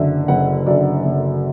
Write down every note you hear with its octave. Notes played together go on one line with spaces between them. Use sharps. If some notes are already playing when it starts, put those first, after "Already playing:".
Already playing: F#1 F#2 D3 E5
F#1 F#5
F#2 D3 D5
F#1